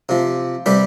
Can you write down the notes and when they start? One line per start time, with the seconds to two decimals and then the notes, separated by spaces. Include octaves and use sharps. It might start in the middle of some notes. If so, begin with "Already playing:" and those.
0.09 C3 F3
0.66 C3 G3 G4 B4